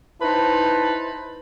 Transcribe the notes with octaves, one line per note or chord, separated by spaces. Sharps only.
D#4 E4 B4 C5 A5